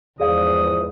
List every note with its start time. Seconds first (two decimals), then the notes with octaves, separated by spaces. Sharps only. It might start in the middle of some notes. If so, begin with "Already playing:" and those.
0.20 E2 G#2 E3 F3 G#4 D5 F5 D#6